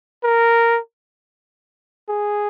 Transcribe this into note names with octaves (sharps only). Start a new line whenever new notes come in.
A#4
G#4